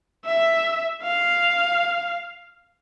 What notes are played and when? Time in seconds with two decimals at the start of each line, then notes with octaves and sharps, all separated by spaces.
0.26 E5
1.03 F5